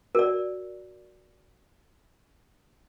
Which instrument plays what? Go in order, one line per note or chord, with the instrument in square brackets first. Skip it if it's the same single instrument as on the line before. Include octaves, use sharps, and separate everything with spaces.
[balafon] F#4 [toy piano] A#4 D5